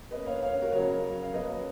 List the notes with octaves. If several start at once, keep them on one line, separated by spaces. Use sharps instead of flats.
B2 A#3 C#4 B4 D#5
C#5 F5
C#5 F5
F#4 A#4
C#3 F#3 C#4 A#4 C#5
F5
B2 F#3 A#3 C#4 B4 D#5